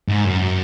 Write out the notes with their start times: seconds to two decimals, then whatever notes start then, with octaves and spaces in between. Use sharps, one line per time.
0.08 G#2
0.24 F#2